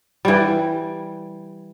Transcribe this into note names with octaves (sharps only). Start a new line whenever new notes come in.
E3 G3